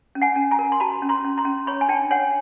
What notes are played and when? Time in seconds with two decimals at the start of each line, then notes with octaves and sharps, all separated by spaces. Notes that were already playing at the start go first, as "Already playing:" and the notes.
0.15 C#4
0.22 F#5 G#5
0.36 C#4
0.51 G#5 A#5
0.59 A#4
0.72 C6
0.80 F#4 A5 B5
1.02 C#4
1.09 A#5 C6
1.24 C#4
1.38 A#5 C6
1.45 C#4
1.67 C#5 B5 C#6
1.81 G#5
1.89 D4 G5 A5
2.11 C#5 F#5 G#5